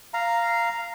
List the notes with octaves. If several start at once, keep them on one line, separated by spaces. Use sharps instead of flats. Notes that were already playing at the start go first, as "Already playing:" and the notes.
F5 A#5